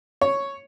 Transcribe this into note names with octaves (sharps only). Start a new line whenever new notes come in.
C#5